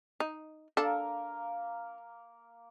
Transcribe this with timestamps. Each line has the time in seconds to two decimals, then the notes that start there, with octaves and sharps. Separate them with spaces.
0.20 D#4
0.77 A#3 D4 A4 A#4